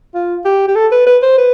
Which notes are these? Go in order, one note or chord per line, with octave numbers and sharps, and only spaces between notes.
F4
G4
G4
A4
B4
B4
C5
B4